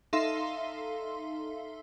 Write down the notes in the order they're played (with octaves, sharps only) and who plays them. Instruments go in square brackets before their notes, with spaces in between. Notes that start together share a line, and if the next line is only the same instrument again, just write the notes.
[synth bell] D#4 A4 E5 F5 C6